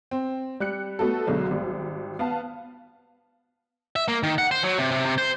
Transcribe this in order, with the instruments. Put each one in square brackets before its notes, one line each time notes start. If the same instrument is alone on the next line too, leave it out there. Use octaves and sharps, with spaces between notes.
[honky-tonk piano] C4
G3 F#6 C#7
A3 B3 F#4 A4
B1 B2 D3 F#3 G#3
G#1 G3
B3 F5 A5
[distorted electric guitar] E5
A#3
D#3
F#5
C5
F#3
C3
C3
C3
C5